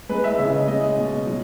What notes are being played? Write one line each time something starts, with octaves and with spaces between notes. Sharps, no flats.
G#3 B4
E5
C#3 E5
D#5
G#3 D#5
B2
F#3